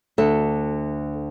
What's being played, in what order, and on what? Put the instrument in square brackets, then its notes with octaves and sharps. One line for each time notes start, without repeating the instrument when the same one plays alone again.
[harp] D2 [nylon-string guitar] A4